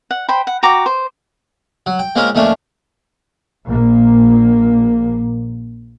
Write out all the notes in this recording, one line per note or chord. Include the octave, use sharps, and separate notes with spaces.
F#5
C5 G5 B5
F#5
F#4 G5 A#5 D6
C5
F#3
G5
G#3 A#3 C4 C#4 F4 A#4
D#2 F3 A3 C#4 D4
A#1 A#2 A#3